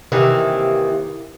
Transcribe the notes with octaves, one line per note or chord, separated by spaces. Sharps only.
C3 D#3 E3 A#3